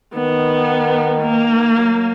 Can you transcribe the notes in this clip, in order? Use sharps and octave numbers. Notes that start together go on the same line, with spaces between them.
D#3 B3
A#3
F#3